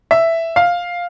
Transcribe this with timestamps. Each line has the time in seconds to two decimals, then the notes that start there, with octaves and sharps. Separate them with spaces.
0.11 E5
0.56 F5